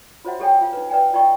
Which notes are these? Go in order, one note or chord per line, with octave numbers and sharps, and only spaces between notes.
F4 F#4 C5 C#5 E5 F#5
G4 A4 C#5 G5 G#5
F4 F5
D#4 B4
B4 D5 G5 G#5
F4 D5 D#5 G5 C#6